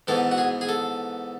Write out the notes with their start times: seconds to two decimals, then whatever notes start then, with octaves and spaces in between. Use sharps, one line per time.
0.07 G#2 E3 B3 A4
0.31 F#4
0.38 G#4
0.61 G#4
0.69 A4